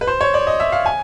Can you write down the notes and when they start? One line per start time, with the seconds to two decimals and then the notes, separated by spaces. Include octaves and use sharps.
0.01 B4
0.07 C5
0.21 C#5
0.34 D5
0.47 D#5
0.60 E5
0.72 F5
0.86 G#5